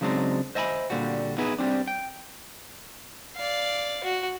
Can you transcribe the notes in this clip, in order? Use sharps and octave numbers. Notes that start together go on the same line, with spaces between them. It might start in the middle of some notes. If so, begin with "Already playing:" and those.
C#3 F#3 G#3 C4 D4 D#4
C5 D#5 E5 G#5 A5 B5
A#2 D3 G3 F#4
B3 D#4 E4 G#4 B4
G3 C4 D4
G5
D5 F5
F#4